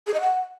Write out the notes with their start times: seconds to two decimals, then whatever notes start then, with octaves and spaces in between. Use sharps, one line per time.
0.07 G#4
0.14 D#5
0.21 F#5